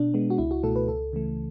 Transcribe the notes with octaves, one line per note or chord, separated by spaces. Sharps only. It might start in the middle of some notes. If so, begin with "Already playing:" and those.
Already playing: B2 D4
G#3 B3
F#4
C#2 E4
F#4
B2 A3 A4
B4
C#2 A4
C#3 E3 A3